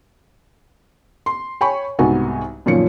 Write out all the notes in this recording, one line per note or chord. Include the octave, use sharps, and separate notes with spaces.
C6
C#5 G5 G#5 B5 C#6
C2 G#2 B3 D#4 F#4 G#5
F#2 A#2 D#3 F3 C#4 C#7